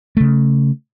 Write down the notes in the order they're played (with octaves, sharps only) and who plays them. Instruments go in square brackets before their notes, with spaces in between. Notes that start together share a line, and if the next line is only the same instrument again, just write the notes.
[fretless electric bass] C#3 A3